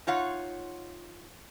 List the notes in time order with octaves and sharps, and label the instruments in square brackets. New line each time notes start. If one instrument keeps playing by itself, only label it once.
[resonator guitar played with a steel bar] D#4 F4 C#5 F#5